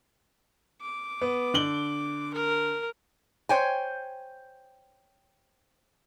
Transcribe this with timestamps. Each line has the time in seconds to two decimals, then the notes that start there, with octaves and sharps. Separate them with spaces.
0.81 D6
1.22 B3
1.54 D3 F#7 G7
2.34 A#4
3.49 C5 C#5 G5 G#5